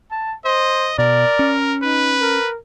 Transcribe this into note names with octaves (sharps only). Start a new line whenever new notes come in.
A5
C5 D#5
B2 A#4 D5
C#4
D#4 B4
A#4